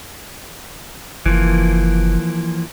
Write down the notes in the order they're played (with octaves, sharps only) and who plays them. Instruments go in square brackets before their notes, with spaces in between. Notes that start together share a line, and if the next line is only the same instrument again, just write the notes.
[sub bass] F#1 [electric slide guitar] E3 F3 A#3